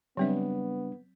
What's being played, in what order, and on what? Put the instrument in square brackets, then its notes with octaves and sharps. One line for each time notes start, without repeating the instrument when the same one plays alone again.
[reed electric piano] C#3 G3 D4 [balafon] F#3 C4 E5 [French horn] B3